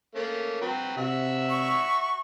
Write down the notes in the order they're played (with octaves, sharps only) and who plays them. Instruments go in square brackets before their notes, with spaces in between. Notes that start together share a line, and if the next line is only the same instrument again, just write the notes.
[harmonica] A3 A#3 C#4
F#3 C4 B4
[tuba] C3 [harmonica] F#4 E5 E6
[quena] C#6